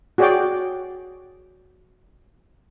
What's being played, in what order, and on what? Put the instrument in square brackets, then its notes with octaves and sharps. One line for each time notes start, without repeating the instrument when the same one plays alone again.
[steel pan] F#4 G#4 C#5 D5 G5 D6